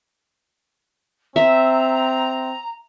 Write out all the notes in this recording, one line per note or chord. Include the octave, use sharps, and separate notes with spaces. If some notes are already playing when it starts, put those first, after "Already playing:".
C4 E5 A#5